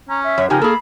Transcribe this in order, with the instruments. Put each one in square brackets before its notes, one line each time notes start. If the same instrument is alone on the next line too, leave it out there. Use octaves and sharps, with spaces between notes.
[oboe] C#4 [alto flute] A#5
[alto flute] E5
[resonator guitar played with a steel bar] F#2 [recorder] C#5
[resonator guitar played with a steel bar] C#3 F3 G#5 [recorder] D#4 [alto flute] G4 [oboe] A#4
[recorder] A#3 [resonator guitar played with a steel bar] G#4 A4 [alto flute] B5